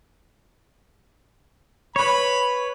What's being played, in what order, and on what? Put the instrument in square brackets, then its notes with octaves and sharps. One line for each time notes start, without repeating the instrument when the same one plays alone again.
[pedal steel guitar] B4 C#5 [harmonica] B5